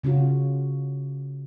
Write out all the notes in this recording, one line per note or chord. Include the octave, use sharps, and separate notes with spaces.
C#3 C#4 F4 F#4